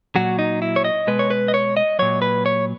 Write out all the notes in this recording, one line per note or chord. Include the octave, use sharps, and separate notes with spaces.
A#2 F#3 F#4
D#4
E4
C#5
D#5
B2 G#3 B4
C#5
B4
D#5
C#5
D#5
A#2 F#3 C#5
B4
C#5